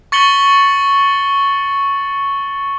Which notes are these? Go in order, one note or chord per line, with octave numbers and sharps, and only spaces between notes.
C#6 A6 C#7 F#7 G7